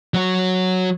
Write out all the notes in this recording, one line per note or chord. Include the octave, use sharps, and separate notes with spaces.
F#3 F#4